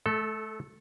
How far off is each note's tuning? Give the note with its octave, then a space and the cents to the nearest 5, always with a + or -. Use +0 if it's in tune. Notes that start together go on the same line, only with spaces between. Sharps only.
A3 -30 A4 +0